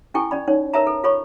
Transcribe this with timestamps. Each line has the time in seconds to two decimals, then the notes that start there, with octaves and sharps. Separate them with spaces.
0.14 C#4 E4 A4 G5 G#5 C#6
0.31 C#4 D5 B5
0.48 C#4 D#4 C#5
0.74 A#4 B4 C#5 E5 A5 A#5
0.87 A4 B4
1.04 F4 A4 C#5 B5 C#6